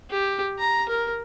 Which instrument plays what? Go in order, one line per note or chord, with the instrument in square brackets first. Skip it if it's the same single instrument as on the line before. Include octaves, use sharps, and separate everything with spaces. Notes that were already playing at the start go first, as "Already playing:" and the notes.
[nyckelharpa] G4
A#5
A#4